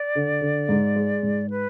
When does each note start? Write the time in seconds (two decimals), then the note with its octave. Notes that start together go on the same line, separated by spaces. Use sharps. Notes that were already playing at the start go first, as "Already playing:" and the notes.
Already playing: D5
0.15 D3
0.41 D3
0.69 G#2
0.96 G#3
1.23 G#2
1.50 B4